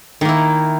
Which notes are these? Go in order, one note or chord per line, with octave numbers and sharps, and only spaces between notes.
D#3 A#3 E4